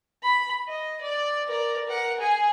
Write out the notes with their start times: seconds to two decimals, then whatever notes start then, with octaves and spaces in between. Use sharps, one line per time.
0.23 B5
0.68 D#5
1.01 D5
1.47 A#4 D5
1.88 A#4 F#5
2.19 G#4 G#5